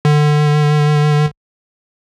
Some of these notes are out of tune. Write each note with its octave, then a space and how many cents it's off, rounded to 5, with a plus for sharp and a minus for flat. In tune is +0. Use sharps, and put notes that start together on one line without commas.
D3 +25